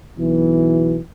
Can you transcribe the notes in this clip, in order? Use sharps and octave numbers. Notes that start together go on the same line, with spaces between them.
B1 B2 E3